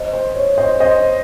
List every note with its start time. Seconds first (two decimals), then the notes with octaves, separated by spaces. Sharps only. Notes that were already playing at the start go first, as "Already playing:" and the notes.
Already playing: C5 D#5
0.13 C5
0.35 C#5
0.58 C5 D#5
0.80 C5 D#5